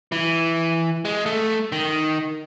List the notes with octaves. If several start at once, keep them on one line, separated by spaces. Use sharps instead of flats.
E3
G#3
A3
D#3